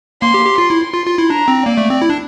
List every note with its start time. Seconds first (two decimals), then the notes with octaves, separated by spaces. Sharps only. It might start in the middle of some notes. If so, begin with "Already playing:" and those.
0.22 A#3 C6
0.34 G4
0.46 G4
0.58 F4 C6
0.70 E4
0.94 F4
1.06 F4
1.18 E4
1.30 D4 A#5
1.48 C4
1.66 A#3 D5
1.78 A3
1.90 C4
2.02 E4
2.10 D4